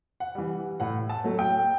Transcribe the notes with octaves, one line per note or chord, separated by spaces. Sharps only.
F#5
E3 G3
A2 F#5
A5
F#3 A3
G5